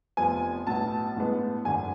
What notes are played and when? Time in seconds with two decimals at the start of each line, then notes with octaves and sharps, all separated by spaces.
0.17 F1 F2 F3 B3 G#5
0.67 B1 A2 F#3 B3 A5
1.16 A1 A2 G#3 B3
1.65 G#1 F#2 D3 G#5